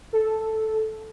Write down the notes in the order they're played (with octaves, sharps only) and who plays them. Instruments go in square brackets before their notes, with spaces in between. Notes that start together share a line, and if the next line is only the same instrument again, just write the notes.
[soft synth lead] A4